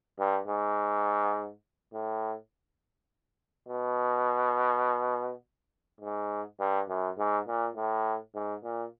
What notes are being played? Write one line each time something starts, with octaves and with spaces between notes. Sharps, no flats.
G2
G#2
A2
B2
G#2
G2
F#2
G#2
A#2
A2
G#2
A#2